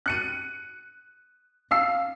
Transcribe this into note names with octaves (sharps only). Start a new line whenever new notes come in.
F#6 C#7 D#7
F5 E6 C7